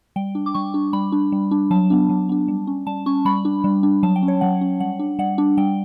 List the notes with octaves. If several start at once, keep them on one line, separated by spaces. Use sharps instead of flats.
G3 G5
D4
D6
G3 C#6
D4
G3 B5
D4
G3
D4
F#3 A5
B3 D4
F#3
B3 D4
G3
C#4
G3 A5
C#4 C#6
G3 B5
D4
G3
D4
F#3 A5
G5
C#4
C#5
F#3 F#5
C#4
G3 F#5
D4
G3 F#5
D4
G3 G5